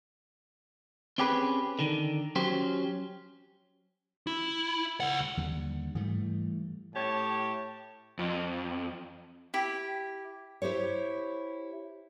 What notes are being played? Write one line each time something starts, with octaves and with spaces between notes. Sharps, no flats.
C4 C#4 G4 G#4 B4
D3 D#3
F#3 C#4 G4 C5
E4
C#2 F#5
D#2 D3 G3
G#2 E3 G3 A3
A2 G4 C#5 A5
F2
E4 G4
E4 G4 C5 C#5